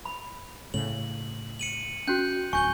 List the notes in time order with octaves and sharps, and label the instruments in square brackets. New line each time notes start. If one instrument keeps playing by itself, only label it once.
[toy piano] B5
[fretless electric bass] A2 C#3 [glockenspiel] F#7
[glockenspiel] C#7 D#7 F#7
[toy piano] C#4 F#4 [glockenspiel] F#6 G6
[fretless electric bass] D1 [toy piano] G#5 [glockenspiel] C#6 G6 G7